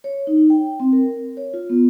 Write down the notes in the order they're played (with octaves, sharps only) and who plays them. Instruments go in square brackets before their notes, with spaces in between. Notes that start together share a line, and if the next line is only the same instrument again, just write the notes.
[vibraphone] C#5
D#4
G5
C4
A#4
C#5
F4
B3